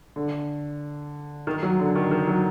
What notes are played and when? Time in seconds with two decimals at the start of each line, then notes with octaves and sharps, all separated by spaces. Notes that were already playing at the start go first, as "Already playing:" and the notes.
0.16 D3
1.47 D#3
1.63 F#3
1.79 D3
1.95 D#3
2.11 D#3
2.27 F#3